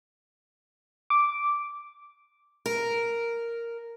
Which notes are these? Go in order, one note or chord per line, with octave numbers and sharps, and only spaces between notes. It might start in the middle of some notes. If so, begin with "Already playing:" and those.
D6
A#4